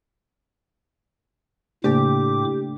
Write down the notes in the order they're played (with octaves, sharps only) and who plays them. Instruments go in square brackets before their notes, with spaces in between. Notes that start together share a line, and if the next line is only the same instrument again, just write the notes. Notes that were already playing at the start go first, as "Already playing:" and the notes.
[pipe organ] A2 D6 [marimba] C#3 A#3 [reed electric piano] A3 D4 [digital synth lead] G4